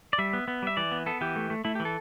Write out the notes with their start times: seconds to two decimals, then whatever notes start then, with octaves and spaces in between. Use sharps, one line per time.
0.13 D5
0.18 G3 E5
0.33 B3
0.48 B3
0.62 G3 E5
0.77 E3 D5
0.92 B3
1.06 B3 A4
1.21 E3 G4
1.36 A3
1.50 A3
1.65 A3 E4
1.75 G4
1.80 E3
1.85 A4